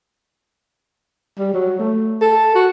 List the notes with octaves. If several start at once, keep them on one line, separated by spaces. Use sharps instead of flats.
G3
F#3
A3
A4
F#4